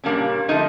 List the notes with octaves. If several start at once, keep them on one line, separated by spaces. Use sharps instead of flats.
A#2 G3 A#3 C#4 D4
D3 F3 A3 D#4